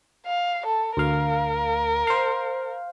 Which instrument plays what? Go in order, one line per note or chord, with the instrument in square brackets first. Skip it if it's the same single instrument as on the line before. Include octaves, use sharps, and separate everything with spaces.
[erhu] F5
A4
[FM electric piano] D2 F5 [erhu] A#4
[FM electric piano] C5 F5